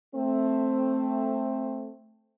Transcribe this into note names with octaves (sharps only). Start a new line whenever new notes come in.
A3 C4